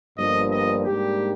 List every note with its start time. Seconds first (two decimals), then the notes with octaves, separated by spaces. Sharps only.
0.18 G1 G2 F3 A#3 D4 D#5
0.52 D#5
0.86 G#2 G3 A#3 D4 G4